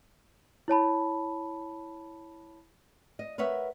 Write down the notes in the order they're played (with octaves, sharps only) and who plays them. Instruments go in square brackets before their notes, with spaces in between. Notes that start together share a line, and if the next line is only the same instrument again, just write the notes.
[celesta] E4 C#5 A5 B5
[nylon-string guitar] D#5
A#4 B4 C#5 E5 F#5